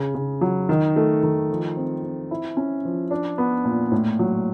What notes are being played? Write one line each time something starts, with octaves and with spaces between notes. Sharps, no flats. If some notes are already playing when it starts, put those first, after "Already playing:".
Already playing: C#3
C#3
F#3
D#3
A3
D#3
F3
C4
C4
E4
C#4
F3
D4
B3
A#2
A2
F#3